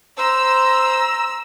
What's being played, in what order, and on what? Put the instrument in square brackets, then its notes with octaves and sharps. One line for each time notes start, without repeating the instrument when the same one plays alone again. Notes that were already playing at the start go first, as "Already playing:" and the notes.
[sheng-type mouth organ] C5 [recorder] A#5 [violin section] E6